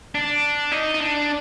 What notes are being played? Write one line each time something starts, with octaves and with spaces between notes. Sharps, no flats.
D4
D#4
D#4
D4